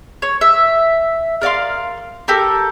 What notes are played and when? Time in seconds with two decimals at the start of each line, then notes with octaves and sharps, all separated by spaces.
0.22 C#5
0.41 E5
1.41 A#4 D5 F5 C6
2.28 G4 A4 A#4